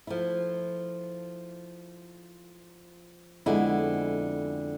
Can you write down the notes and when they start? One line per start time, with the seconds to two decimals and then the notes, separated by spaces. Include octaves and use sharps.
0.07 F3 A3 E4
3.46 F2 D3 G#3 B3 E4